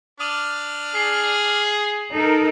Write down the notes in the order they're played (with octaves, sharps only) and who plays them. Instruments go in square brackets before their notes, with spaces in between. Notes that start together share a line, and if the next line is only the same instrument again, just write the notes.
[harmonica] D4 D5 F6 [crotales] D#6 D#7 F#7
[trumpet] G#4 [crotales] C7 F#7
[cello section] D#4 A4 A#4